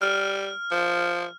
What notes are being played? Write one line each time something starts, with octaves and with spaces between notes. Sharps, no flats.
G3 F6
F3